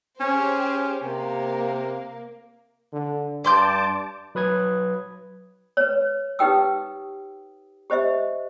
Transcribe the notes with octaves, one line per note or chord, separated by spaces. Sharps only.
C#4 G4 G#4 C5
C3 A#3
D3
G2 D5 A5 C6 D6 G6
F#3 B4 D#6 G#6
B4 C#5
D#4 G4 B4 G5 D#6 E6
G4 C5 D#5 E5